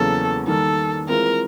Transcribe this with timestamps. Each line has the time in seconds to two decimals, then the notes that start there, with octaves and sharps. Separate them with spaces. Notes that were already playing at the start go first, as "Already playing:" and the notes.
Already playing: E2 C#3 F#3 A#3 C#4 A4
0.47 D#3 G3 A#3 A4
1.09 E3 G#3 C4 F4 A#4